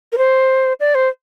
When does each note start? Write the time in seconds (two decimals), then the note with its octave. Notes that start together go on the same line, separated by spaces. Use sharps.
0.12 A#4
0.18 C5
0.80 D5
0.95 C5